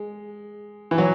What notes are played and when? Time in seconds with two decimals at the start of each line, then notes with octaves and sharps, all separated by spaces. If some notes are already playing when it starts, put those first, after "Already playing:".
Already playing: G#3
0.91 E3
0.98 F#3